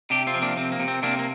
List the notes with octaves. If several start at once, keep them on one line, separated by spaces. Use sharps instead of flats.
C3 D4 G4
C4 F4
F3
A#3 D4
C3 C4
A#3
C3
C4
C3 A#3 D4
A#3